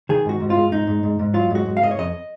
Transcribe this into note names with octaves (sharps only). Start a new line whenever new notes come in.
D#3 G#4
G#2 F#4
G#2
F4
G#2
G#2 D#4
G#2
G#2
G#2
F#3 F4
G#2 F#4
G#2
F5
G#2 D#5
C#5
F2 D#5